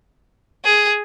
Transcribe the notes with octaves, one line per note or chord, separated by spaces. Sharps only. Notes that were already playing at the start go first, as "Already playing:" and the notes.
G#4